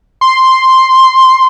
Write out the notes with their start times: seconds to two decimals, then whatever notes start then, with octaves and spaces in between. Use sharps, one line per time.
0.21 C6